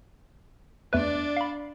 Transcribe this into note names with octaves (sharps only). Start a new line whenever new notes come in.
E2 A3 D4 B4 D5
F5 B5